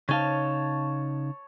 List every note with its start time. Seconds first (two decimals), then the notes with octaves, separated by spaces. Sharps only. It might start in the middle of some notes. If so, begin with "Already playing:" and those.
0.09 C#3 D#4 C#5 F5 A5